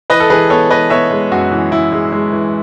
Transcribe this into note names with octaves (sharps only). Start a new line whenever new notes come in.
E3 B4 D#5
A4
E3 G#4 B4
B3 A4 C#5
E3 B4 D#5
B3 C#5 E5
G#3
F#2 F#4
E3
E3 E4
G#3
G#3
E3